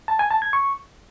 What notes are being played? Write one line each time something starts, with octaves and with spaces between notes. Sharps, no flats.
A5
G#5
A5
G#6
C#6